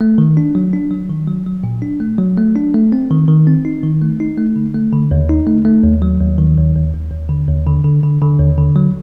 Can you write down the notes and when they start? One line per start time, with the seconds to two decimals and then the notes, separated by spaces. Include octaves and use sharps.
0.01 A3
0.18 D#3
0.37 D4
0.55 F#3
0.73 D4
0.91 F#3
1.10 D#3
1.28 F#3
1.46 F#3
1.64 A#2
1.82 D4
2.00 A3
2.18 F#3
2.38 A3
2.56 D4
2.74 A3
2.92 C4
3.11 D#3
3.28 D#3
3.47 C4
3.65 D#4
3.83 D#3
4.02 A3
4.20 D#4
4.38 A3
4.56 D3
4.74 A3
4.92 D3
5.11 D#2
5.30 D#4
5.47 A3
5.65 A3
5.84 D#2
6.02 F#3
6.20 D#2
6.38 D#3
6.57 D#2
6.75 D#2
6.93 D#2
7.11 D#2
7.29 D3
7.48 D#2
7.67 D3
7.84 D3
8.03 D3
8.21 D3
8.39 D#2
8.58 D3
8.76 F#3